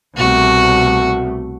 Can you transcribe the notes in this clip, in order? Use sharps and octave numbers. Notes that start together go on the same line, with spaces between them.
C2 B2 A3 F#4